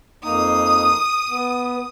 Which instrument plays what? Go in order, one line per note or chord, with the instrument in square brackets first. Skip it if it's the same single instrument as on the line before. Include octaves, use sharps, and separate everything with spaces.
[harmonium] F2 A#3 D#4 [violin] D#6
[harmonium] B3